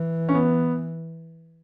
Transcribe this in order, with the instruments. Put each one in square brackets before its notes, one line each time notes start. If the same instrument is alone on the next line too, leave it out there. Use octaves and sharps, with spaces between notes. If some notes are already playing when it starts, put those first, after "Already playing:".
Already playing: [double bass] E3
[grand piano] C#4
B3